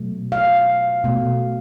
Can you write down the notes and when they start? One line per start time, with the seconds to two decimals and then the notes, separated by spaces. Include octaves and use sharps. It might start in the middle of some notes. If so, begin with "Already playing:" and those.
Already playing: B2 F#3 A3
0.32 F5
1.04 B2 A3